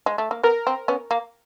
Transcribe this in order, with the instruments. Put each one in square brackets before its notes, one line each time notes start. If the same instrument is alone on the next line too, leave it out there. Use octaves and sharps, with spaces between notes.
[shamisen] G#3
A3
A#3
[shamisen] B3 [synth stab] A#4
[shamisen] C4
B3 C#4
A#3